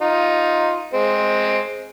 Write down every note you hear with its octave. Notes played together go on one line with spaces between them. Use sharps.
D#4 F4
G#3 C4